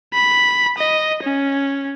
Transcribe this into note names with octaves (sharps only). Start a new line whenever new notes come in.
B5
D#5
C#4